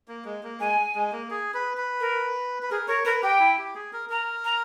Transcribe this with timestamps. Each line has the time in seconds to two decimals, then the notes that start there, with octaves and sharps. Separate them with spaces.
0.08 A#3
0.25 G#3
0.43 A#3
0.60 G#3 G#5
0.95 G#3
1.12 A#3
1.30 G#4
1.54 B4
1.77 B4
2.00 A#4
2.63 B4
2.70 G#4 A#4
2.88 A#4 C#5
3.05 A#4 B4
3.23 G4 G5
3.40 E4
3.58 G4
3.75 G#4
3.93 A#4
4.10 A#4 A#5
4.45 A#5